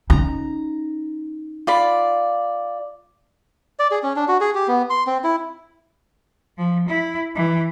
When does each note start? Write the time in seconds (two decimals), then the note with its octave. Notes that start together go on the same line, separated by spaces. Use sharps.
0.10 C#4 D#4 A#5
1.67 F4 D5 B5
3.79 D5
3.91 G#4
4.03 C#4
4.16 D4
4.28 F#4
4.41 G#4
4.55 G4
4.68 B3
4.90 C6
5.07 C4
5.24 E4
6.58 F3
6.88 E4
7.35 E3